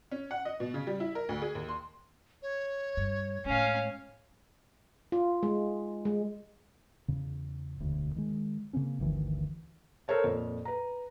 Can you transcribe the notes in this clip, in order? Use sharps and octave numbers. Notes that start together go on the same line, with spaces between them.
C#4
F#5
D#5
B2
C#3
G3
E4
A#4
D2
G#4
D#2
C6
C#5
G2
A2 G#3 C#4 F5
F4
G#3
G#3
E2 C#3
E1 D2
D#3 G#3
C#3 A#3 C4 C#4
G1 D2 D#3 E3
A4 A#4 C5 C#5 A5
F2 A#2
B4 A#5